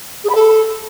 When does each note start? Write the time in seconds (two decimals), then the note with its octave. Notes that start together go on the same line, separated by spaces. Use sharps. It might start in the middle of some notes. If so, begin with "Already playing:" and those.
0.24 G#4
0.29 B5
0.34 A4